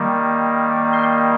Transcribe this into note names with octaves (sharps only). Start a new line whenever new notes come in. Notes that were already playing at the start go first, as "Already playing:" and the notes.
Already playing: D#3 G3 A#3
C6